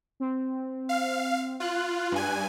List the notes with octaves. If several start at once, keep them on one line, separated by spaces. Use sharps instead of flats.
C4
F5
F4 F#6
G2 G#5